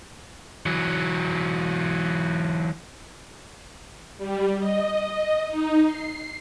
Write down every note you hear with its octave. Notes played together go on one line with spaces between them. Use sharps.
E3 F#3
G3
D#5
D#4
C7